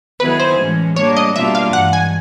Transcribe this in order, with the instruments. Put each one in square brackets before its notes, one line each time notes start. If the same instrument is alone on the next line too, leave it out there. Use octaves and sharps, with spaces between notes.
[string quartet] D#3 F#3 B3 E4 G#4 [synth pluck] B4
[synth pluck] C5
[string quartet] A2 E3 G#3 C#4
[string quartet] G3 A#3 D4 [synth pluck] C#5
[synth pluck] D#5
[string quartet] B2 G3 A#3 D4 F4 [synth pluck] E5
[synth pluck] F5
[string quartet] G2 E3 G#3 [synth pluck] F#5
[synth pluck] G#5